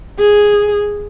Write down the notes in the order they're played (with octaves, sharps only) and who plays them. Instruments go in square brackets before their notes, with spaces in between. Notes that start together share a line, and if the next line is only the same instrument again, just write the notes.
[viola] G#4